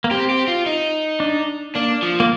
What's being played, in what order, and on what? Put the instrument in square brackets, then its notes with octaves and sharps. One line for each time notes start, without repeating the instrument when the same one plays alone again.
[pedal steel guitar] A#3
[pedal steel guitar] C4 [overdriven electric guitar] G4
[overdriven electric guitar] G4
F4
D#4
[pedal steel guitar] D4
[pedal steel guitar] A#3 [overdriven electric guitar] D4
[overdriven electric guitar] F3
[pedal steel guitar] A#3